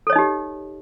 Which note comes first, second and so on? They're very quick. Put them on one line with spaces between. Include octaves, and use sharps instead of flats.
A4 C#5 D#5 D#4 G4